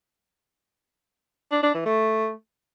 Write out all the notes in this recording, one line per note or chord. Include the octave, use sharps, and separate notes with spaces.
D4
D4
E3
A3